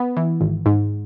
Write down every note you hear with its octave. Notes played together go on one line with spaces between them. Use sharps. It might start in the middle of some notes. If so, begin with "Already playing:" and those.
Already playing: B3
E3
G#1
G#2